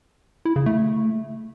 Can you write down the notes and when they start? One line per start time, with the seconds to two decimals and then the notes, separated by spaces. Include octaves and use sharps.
0.45 E4
0.56 C#3
0.66 A3